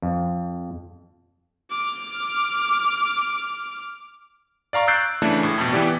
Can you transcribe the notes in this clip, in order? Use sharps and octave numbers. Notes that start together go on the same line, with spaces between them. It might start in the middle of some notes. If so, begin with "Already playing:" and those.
F2
D6 F6
D5 F5 A#5 C#6
E6 F#6 G6 A6 C7 D7
C#3 E3 A3 D4
A2
F2 B2
E3 B3 G4 D5